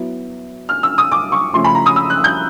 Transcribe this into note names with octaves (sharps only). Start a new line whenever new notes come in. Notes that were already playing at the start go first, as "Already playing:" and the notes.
Already playing: F#3 B3 E4
F6
E6
D#6
D6
C#6
C#3 F3 A3 C6
B5
A#5
D#6
E6
F#6
G6